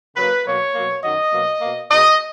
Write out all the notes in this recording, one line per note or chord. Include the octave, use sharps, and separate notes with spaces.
C#3 F#3 A#3 B4
B2 F#3 A#3 C#5
B2 F#3 A#3
F#2 D#3 F#3 D#5
B2 F#3 A#3
B2 A#3
B2 G#3 D#5